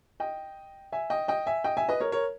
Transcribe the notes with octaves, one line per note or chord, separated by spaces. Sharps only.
D#5 G5
E5 G#5
D#5 G5
D#5 G5
E5 G#5
D#5 G5
E5 G#5
B4 D#5
A#4 C#5
A#4 C#5